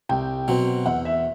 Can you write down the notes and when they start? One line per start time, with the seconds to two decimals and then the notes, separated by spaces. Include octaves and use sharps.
0.09 C2 G5
0.48 B2 F#3 C4
0.86 E2 F#5
1.05 E5